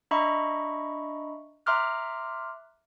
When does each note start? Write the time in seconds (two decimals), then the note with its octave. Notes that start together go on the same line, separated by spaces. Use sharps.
0.11 D4 D#5 E5 A#5 B5 C#6
1.66 E5 A#5 C6 D6 F6 F#6